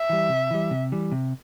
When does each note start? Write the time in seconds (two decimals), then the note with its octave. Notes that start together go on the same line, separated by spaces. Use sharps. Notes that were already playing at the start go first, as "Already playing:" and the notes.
Already playing: E5
0.09 E3 G3
0.29 C3
0.51 E3 G3
0.71 C3
0.92 E3 G3
1.12 C3